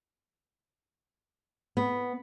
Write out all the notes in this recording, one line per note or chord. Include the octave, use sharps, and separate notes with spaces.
B3